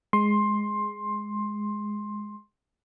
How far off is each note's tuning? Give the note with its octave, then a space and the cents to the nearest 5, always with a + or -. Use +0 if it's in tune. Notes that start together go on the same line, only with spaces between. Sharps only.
G#3 +0 C6 +15